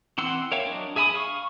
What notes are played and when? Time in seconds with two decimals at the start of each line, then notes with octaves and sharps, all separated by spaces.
0.18 E3 C4 F#5 C6 E6
0.52 A#4 C#5 E5 F5 G5
0.66 F#3 D4 D#5
0.96 G#4 E5 G#5 B5 D#6
1.15 F5 C#6